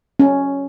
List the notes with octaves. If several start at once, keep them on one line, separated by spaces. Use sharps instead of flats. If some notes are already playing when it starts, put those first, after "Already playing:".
C#4